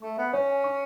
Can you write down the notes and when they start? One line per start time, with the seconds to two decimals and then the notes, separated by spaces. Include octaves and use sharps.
0.02 A3 C#6
0.17 B3 E5
0.33 C#4 C#5
0.49 G#5
0.64 C#6